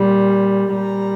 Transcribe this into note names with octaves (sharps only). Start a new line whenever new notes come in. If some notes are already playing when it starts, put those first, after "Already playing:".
Already playing: A#2 G3
A#2 G3 A#5